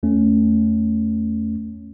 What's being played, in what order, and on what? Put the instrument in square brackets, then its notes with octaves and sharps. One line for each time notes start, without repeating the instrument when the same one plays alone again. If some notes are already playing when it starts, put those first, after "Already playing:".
[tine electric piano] E2 A3 C#4